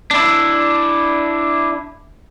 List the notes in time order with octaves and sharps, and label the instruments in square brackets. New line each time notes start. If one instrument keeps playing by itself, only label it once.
[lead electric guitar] D4 E4